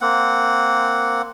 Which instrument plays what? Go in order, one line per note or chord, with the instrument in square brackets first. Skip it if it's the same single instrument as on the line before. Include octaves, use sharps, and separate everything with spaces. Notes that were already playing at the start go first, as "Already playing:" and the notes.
[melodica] A#3 C4 F#5